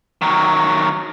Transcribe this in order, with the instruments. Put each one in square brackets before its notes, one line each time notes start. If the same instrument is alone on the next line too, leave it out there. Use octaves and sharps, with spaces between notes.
[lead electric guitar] D#3 F#3